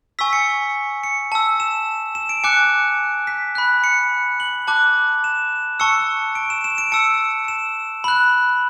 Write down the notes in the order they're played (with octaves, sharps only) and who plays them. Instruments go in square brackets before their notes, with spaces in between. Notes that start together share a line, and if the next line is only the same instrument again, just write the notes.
[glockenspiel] G#5 C#6 E6 B6
C#7
C#7
A5 E6
E7
E7
D7
G#5 D6 F#6 C#7
B6
B5 F#6
C#7
F#7
A5 D6 F#6
E7
A5 C#6 E6 C#7
D7
E7
E7
D7
A5 E6 C#7
E7
B5 F#6 F#7